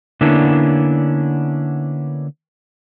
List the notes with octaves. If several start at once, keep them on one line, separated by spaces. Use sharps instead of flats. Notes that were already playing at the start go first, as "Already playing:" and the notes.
D3 A#3 B3 C#4 D4 E4